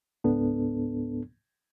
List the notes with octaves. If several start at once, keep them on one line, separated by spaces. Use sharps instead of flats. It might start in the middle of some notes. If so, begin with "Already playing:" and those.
C#2 G#2 B3 D4 A4